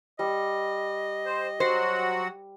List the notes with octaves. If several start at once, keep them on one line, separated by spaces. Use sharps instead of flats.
G3 D#5
C5
F#3 F#4 C5 F#5